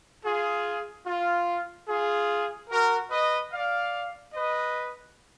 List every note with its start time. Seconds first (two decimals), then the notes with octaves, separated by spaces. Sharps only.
0.24 F4 G#4
1.06 F4
1.88 F4 G#4
2.70 F#4 A#4
3.10 B4 D#5
3.51 D5 F5
4.34 B4 D#5